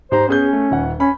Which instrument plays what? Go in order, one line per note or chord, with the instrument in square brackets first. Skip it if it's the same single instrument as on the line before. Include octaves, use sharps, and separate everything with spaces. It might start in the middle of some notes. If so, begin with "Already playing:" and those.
[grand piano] G#2 G4 A#5 [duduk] C5
[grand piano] B3 G#4 G6 [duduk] C#4
[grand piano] A3
D#1 F#5
[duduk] C#4 [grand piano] B5